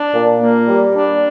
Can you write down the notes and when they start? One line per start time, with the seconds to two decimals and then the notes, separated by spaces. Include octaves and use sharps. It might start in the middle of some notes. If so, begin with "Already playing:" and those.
Already playing: D4
0.13 A#2
0.40 A#3
0.68 G3
0.96 D4